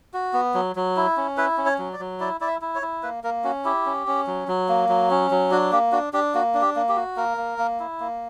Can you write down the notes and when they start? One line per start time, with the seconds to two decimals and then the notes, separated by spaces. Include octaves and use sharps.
0.14 F#4
0.34 B3
0.55 F#3
0.76 F#3
0.97 E4
1.17 C#4
1.37 E4 B4
1.58 C#4
1.66 C#5
1.79 F#3
1.93 D5
1.99 F#3
2.20 E4 D5
2.41 E4 D5
2.47 E5
2.62 E4
2.75 C#5
2.82 E4
3.03 A#3 B4
3.24 A#3 A#4
3.44 C#4 F#4
3.65 E4 G4
3.86 C#4
4.07 C#4
4.27 F#3
4.48 F#3
4.69 A#3
4.89 F#3
5.10 C#4
5.31 F#3
5.51 D4 F#4
5.72 A#3 G4
5.92 D4 F#4
6.13 D4 G4
6.35 A#3 F#4
6.54 D4
6.62 G4
6.76 A#3
6.89 G4
6.97 F#4
7.16 A#3 A#4
7.37 A#3
7.58 A#3
7.80 E4
8.00 A#3